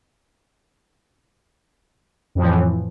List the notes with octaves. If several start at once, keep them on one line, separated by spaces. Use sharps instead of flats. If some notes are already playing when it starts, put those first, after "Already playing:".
F2 A2 E3 F3